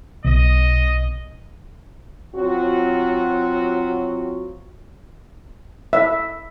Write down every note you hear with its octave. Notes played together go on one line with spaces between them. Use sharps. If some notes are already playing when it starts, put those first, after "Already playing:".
B1 D#5
F#3 C4 F4 F#4
E5